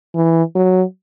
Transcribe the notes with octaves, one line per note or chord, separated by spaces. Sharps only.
E3
F#3